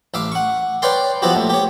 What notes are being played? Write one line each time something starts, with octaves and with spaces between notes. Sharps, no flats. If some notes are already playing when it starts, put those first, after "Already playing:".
A1 E5 F5 D6
F#5 C#6
B4 C#5 D5 F5 G5 C6
F3 B3 E4 F#4 G4
A#1 A3
G4 C#5